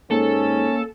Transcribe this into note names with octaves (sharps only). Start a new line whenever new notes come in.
G#2 A#3 C#4 A4